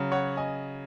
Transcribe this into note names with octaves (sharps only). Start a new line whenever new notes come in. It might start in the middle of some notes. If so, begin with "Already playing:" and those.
Already playing: C#3 F#3
C#5 F#5
D#5 G#5